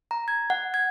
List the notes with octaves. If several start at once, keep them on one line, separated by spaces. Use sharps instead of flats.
A#5
G#6
F#5
G#6